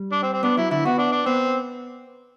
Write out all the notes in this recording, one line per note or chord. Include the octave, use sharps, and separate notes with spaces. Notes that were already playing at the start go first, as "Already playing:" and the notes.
Already playing: G3
D4
C4
C4
B3 D4
F#3 E4
D3 E4
B3 F#4
D4
D4
B3 C4